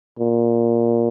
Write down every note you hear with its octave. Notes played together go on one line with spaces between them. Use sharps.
A#2